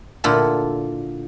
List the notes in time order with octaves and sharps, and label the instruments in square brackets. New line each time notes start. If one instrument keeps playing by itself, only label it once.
[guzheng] A#2 D3 E4 F4 A4